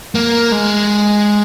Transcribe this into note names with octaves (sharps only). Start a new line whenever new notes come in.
A#3
G#3